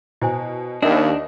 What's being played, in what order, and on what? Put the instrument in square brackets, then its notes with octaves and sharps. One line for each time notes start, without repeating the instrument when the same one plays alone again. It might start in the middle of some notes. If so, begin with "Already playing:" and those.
[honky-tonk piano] B2 [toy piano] E4 C5 G#5
[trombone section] D#2 [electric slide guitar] D4 [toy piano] A#4 C#5 E5 [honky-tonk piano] D#5